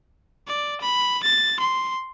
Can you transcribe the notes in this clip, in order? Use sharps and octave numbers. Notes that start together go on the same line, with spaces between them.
D5
B5
A6
C6